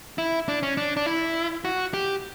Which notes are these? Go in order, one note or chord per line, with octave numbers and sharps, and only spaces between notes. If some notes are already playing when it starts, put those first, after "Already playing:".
E4
D4
C#4
D4
D4
E4
F#4
G4